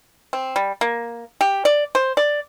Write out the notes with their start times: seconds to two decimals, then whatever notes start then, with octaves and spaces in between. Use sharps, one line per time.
0.33 C4
0.56 G3
0.81 A#3
1.41 G4
1.65 D5
1.95 C5
2.17 D5